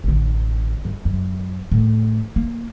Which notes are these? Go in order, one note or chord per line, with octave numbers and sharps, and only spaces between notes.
A1 D3
G1
F#2
A2
A#3